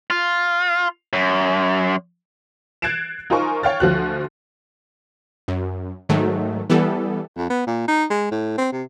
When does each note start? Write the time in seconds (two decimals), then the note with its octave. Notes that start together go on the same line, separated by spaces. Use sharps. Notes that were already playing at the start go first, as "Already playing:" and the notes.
0.10 F4
1.13 F#2
2.82 F#6 G#6 A6 C7 D7 E7
3.30 D#4 F4 A#4 C5 G#5 C#6
3.63 C#5 F5 G5 F6 A6
3.80 D2 F3 F#4 F#6
5.48 F#2
6.09 G#2 D#3 F#3 A3
6.70 E3 G3 B3 A4
7.37 F2
7.50 B3
7.67 A#2
7.88 D#4
8.10 G#3
8.31 A2
8.58 C4
8.72 C3